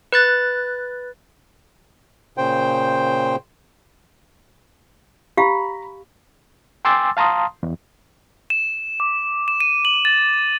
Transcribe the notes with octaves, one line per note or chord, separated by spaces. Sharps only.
B4 F#6 A6
A#2 C#3 C5 G5
G4 F5 A#5 B5
G5 G#5 C6 D6 E6 A6
F5 A5 A#5 C6 D#6
E2
E7
D6
E7
D#7
F#7
A6